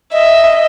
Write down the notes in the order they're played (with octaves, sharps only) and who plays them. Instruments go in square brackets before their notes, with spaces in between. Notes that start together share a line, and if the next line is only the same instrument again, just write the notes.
[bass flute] D#5 [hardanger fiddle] E5